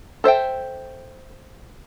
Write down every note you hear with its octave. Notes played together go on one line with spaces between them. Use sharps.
A4 C5 E5 G5